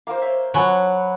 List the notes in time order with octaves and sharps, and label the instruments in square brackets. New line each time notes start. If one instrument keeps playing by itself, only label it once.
[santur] A#3 C5 [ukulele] A#4 F5
[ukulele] C#5 E5 F5
[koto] F#3 [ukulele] F4 G#5 A5 [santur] B4 F#5